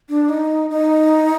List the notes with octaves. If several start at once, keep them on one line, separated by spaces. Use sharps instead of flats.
D4
D#4
D#4